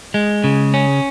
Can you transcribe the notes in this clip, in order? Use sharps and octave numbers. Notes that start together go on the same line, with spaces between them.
G#3
C#3
C#4